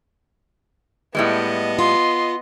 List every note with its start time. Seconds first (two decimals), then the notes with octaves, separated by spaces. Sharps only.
1.15 A2 G3 G#3 B3 D#5
1.79 F4 C6